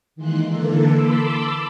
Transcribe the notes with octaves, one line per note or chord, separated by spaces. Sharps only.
D#3 E3 G#3 A#3 C6 F#6
D3 E3 A#3 A4
A5 B5 C6 D6 E6